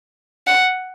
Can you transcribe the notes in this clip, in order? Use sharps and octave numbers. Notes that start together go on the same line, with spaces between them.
F#5